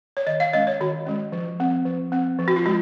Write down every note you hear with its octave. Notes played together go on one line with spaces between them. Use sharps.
C#5
D#3 D#5
F5
G#3 C#4 D#5
C#5
D#3 F#4
G#3 C#4
F3
C4
F3
C4
F3
F#4
F4
G#3 F#4